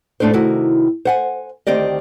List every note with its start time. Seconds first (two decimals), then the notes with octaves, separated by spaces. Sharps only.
0.20 A2 A3 D4 A4 C5
0.34 C3 D#3 E4 F#4
1.05 C5 F#5 G#5
1.67 D2 D#3 C4 G4 D5 D#5